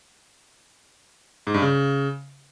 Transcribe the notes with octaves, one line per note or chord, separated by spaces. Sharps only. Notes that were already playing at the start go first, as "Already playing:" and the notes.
G#2
G2
C#3